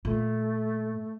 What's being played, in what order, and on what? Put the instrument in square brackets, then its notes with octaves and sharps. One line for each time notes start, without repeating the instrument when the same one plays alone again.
[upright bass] A#2 [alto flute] A3